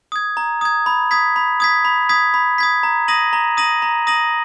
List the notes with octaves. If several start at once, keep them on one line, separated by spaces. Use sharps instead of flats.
D#6 G#6
A#5
D#6 G#6
B5
D#6 G#6 B6
B5
D#6 G#6 B6
B5
D#6 G#6 B6
B5
D#6 G#6 B6
A#5
D#6 A#6 D#7 F#7
A#5
D#6 A#6 D#7 F#7
A#5
D#6 A#6 D#7 F#7